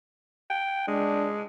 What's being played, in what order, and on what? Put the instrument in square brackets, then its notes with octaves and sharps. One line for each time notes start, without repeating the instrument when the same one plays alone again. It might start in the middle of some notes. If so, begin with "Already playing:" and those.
[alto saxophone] G5
[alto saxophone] G#3 [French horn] D4